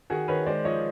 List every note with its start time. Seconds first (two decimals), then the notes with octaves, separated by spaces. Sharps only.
0.10 D#3 F#4 G#4
0.28 D#3 B4 C#5
0.46 G#3 C5 D5
0.65 F3 C#5 D#5